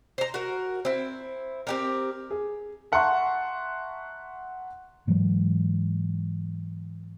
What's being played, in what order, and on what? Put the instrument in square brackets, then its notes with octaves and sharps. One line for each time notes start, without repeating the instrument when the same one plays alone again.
[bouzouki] C5 A#5
F#4 A#4
C4 E4
C4 G4 A#4
[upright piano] G#4
E5 F#5 A5 A#5 C6 C#6
[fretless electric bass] G#2 E3 F#3 G#3